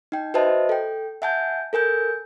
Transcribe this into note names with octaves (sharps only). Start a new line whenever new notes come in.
D#4 G5
F#4 B4 C5 D#5 E5 A5
A4 G5
E5 F#5 G#5 A5 G6
A4 A#4 G#5 G6